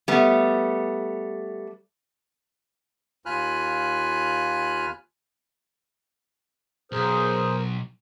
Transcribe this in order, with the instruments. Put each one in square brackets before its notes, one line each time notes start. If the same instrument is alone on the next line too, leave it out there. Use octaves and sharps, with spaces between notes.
[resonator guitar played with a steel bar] G3 A3 B3
[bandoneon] D#2 F4 G#5 B5 F6 F#6
[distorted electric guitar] B1 [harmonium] G#4 A#4 C5